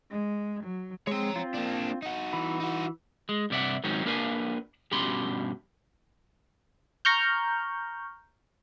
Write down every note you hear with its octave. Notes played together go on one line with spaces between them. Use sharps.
G#3
F#3
G#3 C4 C#5 A#5
C4 F4
A#3 D4
D#4 F#4
E3 B5
D#4 F#4
G#3
G2 C3 D5 E5 F#5
G#2 D#3 F#3 C4 C#4
A#3 D4 A#4 B4 F5 G#5
G2 B2 C#4 G4 B5 C6
A#5 C#6 F6 G6